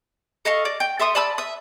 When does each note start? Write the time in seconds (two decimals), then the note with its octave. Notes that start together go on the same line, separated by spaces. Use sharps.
0.45 A4 D#5 F5 C#6
0.65 D5
0.80 G5
0.99 A4 E5 C6 D#6
1.15 D5 A5 B5 E6
1.38 E5 D#6